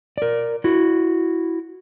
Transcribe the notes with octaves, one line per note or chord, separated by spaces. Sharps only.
A#4 D5
E4 F#4